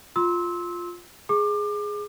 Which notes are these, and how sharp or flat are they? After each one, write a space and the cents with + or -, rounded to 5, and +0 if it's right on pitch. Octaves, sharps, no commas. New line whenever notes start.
F4 +5 C6 +10 E6 -25
G#4 +0 D6 +30